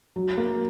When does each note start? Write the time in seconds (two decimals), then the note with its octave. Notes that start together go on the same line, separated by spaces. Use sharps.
0.16 F#3
0.37 A#3